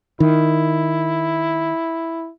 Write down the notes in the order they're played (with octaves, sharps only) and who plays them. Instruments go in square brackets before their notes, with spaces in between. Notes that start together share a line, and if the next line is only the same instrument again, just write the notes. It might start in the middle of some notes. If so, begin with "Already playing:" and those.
[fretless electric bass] D#3 [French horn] E4